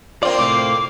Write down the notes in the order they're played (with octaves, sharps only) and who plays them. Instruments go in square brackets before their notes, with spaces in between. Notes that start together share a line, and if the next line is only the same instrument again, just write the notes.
[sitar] A#3 C4 F4 [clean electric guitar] D5
[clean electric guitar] A2 C3 A3 [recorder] D6